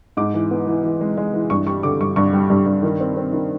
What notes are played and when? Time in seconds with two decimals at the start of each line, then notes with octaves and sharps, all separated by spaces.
0.17 G#2 D6
0.34 E3
0.51 B3
0.67 E3
0.84 E3
1.01 G#3
1.17 G#3
1.34 E3
1.50 G2 C#6
1.67 G3 C#6
1.83 D3 D6
2.01 G2 C#6
2.16 G2 C#6
2.33 G3
2.50 G2
2.66 G2
2.83 D#3
3.00 C4
3.17 C4
3.33 D#3